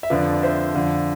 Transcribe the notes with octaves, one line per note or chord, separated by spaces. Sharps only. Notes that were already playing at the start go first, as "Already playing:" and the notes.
E5
F2 D3 F3 B4 D5
D5
C5 E5
F2 D3 F3